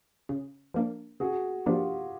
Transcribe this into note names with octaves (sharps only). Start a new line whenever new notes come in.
C#3
F3 A#3 D4
C#3 F#4 G#4
F3 A#3 D4 F4 G4